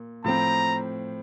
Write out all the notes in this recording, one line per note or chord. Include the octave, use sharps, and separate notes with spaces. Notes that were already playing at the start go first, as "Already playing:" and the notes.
Already playing: A#2
A2 F3 C4 A#5